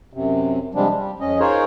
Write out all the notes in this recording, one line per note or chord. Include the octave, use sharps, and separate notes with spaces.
F#2 C3
C3 F3 G3 G#3 D4
G3
F2 C#4 D#5
D#4 F4 G#4 A#4 C5 C#5